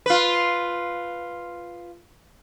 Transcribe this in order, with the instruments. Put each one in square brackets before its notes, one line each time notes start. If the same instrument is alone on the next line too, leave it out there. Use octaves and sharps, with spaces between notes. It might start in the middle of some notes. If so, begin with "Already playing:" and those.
[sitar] F4 B4